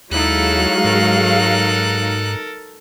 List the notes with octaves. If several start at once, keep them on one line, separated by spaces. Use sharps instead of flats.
D#2 F#3 G#3 D#4 E4 A4 F5 F#6
G#2 A4 A#4